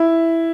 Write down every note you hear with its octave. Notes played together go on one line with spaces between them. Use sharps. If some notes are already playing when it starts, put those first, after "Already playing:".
Already playing: E4